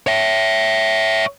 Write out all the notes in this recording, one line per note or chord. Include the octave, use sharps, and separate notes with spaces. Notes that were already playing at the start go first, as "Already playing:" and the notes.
C#5 E5